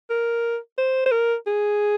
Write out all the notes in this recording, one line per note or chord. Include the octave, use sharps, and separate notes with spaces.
A#4
C5
C5
A#4
G#4